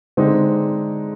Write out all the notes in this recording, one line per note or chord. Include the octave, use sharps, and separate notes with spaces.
D3 G#3 C4 D#4